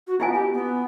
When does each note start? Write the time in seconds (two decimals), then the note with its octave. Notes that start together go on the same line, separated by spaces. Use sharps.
0.07 F#4
0.20 B3 E4 F4 G#5
0.33 G4
0.53 B3